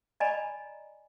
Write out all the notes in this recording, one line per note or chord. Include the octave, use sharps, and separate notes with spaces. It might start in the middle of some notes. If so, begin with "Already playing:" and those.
D5 D#5 G#5 A#5 B5